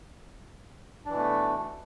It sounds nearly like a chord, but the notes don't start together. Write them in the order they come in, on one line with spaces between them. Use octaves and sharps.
D4 E3 B2 A3